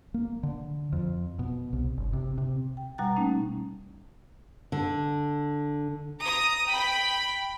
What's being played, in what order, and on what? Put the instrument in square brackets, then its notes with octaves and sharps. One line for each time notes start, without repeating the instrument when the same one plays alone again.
[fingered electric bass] A#3
D3
F2
B2
C2
G1
C3
C3
[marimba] G5
B2 G3 F#5 A#5 F#6 A6
A3 A#3 C#4 D#4
[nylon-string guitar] D3
[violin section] A#5 D#6
G5 B5